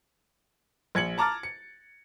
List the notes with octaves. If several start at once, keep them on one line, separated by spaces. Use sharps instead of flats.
A#1 G#6 C#7 F#7
A5 A#5 D6 F6 A6
C#7